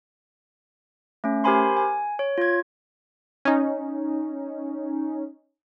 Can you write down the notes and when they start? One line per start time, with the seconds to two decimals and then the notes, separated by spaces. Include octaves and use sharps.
1.24 A3 C#4
1.44 G4 A#4 C5 G#5 B5 C6
1.77 G#5
2.19 C#5
2.38 F4 G#6
3.45 C#4 D#4